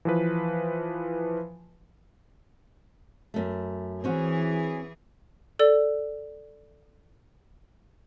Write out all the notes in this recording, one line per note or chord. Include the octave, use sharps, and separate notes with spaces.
E3 F3 B4
F#2 A3
E3 C4 C#4 F#4 G#4
A4 D5